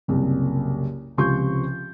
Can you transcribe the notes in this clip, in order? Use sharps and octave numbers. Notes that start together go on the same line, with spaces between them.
F#1 C2
C#2 C3 F3 C6 C#6 G6